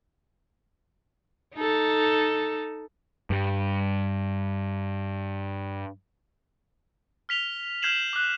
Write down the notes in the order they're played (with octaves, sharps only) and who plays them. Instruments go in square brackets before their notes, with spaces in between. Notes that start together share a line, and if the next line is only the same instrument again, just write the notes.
[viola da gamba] D#4 A4
[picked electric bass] G2 G3
[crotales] F6 B6 F7 G7
F6 G6 G#6 C7 E7 F#7
D6 F#6